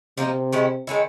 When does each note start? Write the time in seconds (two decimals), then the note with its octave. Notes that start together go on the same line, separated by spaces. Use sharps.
0.17 C3 F3 A#3 D#4
0.53 D#3 G#3 C#4 E4
0.87 D#3 G#3 C#4 E4